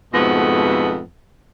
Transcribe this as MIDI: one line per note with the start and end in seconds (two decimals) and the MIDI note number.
0.13 1.01 41
0.13 1.01 44
0.13 1.01 47
0.13 1.01 57
0.13 1.01 59